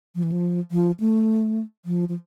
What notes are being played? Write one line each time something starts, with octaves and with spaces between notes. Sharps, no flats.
F3
E3
F3
F3
A3
F3
F3